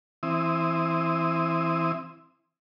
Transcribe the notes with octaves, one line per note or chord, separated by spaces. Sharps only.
E3 C4 E4 D#6